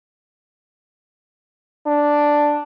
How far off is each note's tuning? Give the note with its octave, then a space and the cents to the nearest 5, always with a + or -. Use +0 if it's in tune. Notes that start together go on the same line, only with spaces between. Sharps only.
D4 +0